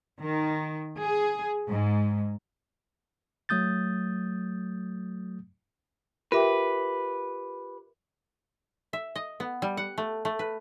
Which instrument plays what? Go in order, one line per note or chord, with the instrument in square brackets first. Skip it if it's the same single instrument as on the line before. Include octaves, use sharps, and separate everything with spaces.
[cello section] D#3
G#4
G#2
[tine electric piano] F#3 A3 D#6 G6 A6
[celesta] F4 G4 D6 [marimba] A#4 E5 G5 [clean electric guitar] B4
[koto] E5
D#5
B3
G3
F#5
A3
A3
B4